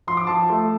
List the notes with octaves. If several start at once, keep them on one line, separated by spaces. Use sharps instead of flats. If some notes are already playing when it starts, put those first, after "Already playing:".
F3 C6
D6
F3 A5 C6
A3